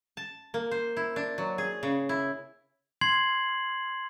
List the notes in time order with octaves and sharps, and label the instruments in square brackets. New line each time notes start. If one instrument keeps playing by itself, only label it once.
[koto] A5
A#3
C5
E4
D4
F#3
G#4
C#3
E4
[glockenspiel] C6 G#6 C7 F#7